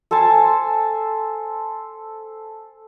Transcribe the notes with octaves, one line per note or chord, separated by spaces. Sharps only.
A4 C5 G#5 A5